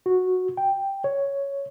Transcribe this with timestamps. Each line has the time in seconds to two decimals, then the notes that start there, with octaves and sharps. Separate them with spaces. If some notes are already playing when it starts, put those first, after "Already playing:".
0.06 F#4
0.57 G5
1.04 C#5